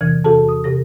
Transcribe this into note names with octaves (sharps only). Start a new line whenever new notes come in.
E2 C3 E3 G#6
E2 C3 F#4 G#4 A4 A5
D#6
C3 G4 A#6